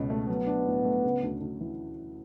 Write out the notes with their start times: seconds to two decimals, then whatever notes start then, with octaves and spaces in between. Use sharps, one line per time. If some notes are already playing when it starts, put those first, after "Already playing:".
Already playing: C#2 B2 C#4
0.10 A3
0.28 F#3 B3
0.47 D4
0.66 A2
0.85 A3
1.04 C#3
1.23 D2
1.41 D2
1.61 E3